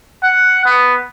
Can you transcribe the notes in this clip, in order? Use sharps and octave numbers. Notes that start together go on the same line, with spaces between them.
F#5
B3